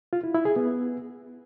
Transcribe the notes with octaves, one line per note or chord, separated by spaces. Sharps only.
F4
E4
E4
G#4
B3